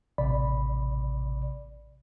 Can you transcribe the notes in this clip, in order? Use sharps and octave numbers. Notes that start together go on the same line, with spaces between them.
A1 C3 D5 B5